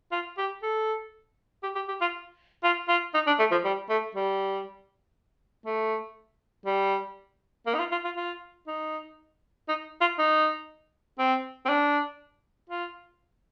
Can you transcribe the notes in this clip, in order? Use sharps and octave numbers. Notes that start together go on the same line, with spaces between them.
F4
G4
A4
G4
G4
G4
F4
F4
F4
D#4
D4
A3
F3
G3
A3
G3
A3
G3
A#3
D#4
F4
F4
F4
F4
D#4
D#4
F4
D#4
C4
C4
D4
F4